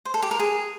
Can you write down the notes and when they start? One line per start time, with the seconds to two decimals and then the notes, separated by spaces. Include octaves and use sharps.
0.05 C5
0.14 A4
0.22 G4
0.31 A#4
0.39 G#4